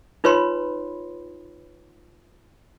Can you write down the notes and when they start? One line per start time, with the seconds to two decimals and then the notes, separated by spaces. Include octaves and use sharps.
0.24 D#4 F4 B4 C#5 B5 C6